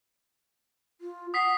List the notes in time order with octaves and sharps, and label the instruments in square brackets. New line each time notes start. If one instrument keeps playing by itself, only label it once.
[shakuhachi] F4
[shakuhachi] F#5 [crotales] D#6 B6 C7